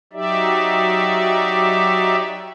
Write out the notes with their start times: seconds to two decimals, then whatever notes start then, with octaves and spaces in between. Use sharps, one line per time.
0.13 F#3 D#4 G4 D5 E5